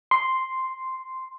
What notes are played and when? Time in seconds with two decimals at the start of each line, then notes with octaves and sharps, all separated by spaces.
0.11 C6